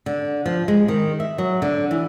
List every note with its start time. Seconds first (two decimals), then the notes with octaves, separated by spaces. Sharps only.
0.06 D3
0.46 F3
0.68 G#3
0.88 D#3
1.20 E5
1.38 F#3
1.62 D3
1.91 E3